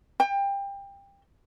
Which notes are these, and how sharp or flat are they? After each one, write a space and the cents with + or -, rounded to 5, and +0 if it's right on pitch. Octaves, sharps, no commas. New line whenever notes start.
G5 +25